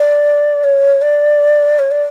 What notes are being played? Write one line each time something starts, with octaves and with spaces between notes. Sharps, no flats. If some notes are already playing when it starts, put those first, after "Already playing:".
Already playing: D5
C#5
D5
C#5
D5